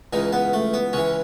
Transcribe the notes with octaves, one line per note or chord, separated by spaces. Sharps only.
C#2 C#3 E3 D#4
B3
A3
B3
C#2 C#3 E3 C#4